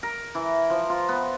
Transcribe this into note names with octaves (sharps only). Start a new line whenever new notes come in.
A#4
E3
F3
F4
B3